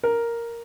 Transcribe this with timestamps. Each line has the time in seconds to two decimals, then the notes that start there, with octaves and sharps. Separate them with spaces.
0.03 A#4